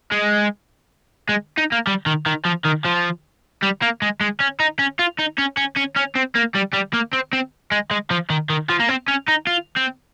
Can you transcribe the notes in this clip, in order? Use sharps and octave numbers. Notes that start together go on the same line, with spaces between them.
G#3
G#3
D#4
A#3
G3
D#3
D#3
F3
D#3
F3
G3
A#3
G#3
G#3
C#4
D#4
C#4
F4
D#4
C#4
C#4
C#4
C#4
C4
A#3
G3
G3
A#3
C4
C4
G#3
G#3
F3
D#3
D#3
F3
A#3
C4
C#4
D#4
F4
C4